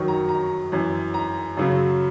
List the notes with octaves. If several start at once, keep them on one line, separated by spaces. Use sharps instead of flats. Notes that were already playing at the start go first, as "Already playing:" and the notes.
Already playing: F#2 D#3 F#3 C#6
A#5
A#5
F#2 E3
A#5
F#2 C#3 F#3